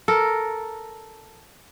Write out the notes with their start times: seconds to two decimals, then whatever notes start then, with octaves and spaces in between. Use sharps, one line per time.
0.08 A4 A#4